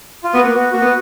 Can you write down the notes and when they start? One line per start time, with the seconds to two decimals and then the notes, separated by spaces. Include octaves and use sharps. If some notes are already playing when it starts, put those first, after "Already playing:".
0.24 F4
0.34 B3 F#4
0.43 A#3
0.52 B3 F#4
0.73 A#3 F#4
0.82 B3